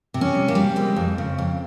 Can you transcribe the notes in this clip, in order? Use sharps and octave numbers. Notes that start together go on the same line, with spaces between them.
C3
C#4
G3
A#3
G3
G#3 C4
F2
C#3
F2